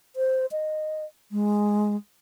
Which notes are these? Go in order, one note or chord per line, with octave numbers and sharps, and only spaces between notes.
C5
D#5
G#3